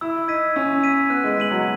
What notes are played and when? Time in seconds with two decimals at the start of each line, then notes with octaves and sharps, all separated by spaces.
0.01 E4 E6
0.28 D#4 G#6 B6 D#7
0.56 C#4 E6
0.83 G#6 B6 D#7
1.10 B3 F#6
1.24 G#3
1.37 G#3 B6 D#7 F#7
1.51 F#3